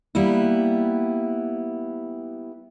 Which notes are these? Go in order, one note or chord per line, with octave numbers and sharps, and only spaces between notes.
G3 A#3 B3 E4